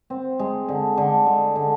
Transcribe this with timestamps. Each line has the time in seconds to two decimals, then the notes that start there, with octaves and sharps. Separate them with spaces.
0.10 C4
0.39 G#3
0.68 D3
0.97 D3
1.26 G#3
1.56 D3